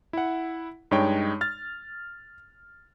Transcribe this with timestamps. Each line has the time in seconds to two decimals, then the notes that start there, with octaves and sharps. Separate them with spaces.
0.13 E4 F#5
0.91 G2 G#3 D#4 C#5 G5
1.41 F6 A6